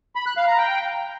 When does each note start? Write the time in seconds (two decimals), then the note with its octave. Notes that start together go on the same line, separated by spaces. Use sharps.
0.15 B5
0.26 F#6
0.37 F5
0.48 A#5
0.58 G5